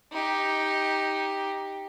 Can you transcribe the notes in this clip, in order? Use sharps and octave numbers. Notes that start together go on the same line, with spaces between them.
D#4 G4